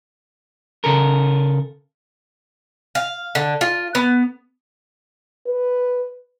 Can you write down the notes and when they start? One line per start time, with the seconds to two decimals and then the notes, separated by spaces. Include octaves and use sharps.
0.84 C#3 A4 A#4
2.95 F5
3.35 D3
3.61 F4
3.95 B3
5.48 B4